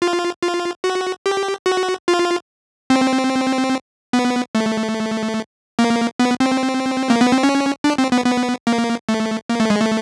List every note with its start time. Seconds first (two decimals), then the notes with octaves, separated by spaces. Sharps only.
0.02 F4
0.43 F4
0.84 F#4
1.26 G4
1.66 F#4
2.08 F4
2.90 C4
4.13 B3
4.55 A3
5.79 A#3
6.19 B3
6.40 C4
7.10 A#3
7.21 B3
7.32 C4
7.43 C#4
7.84 D4
7.98 C4
8.12 B3
8.26 B3
8.67 A#3
9.09 A3
9.49 A#3
9.60 A3
9.70 G#3
9.80 A3